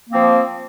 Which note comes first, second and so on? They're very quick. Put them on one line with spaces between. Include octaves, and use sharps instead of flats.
A#3 C4 F3